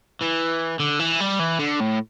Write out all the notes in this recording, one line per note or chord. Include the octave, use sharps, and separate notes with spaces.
E3
D3
E3
G3
E3
D3
A2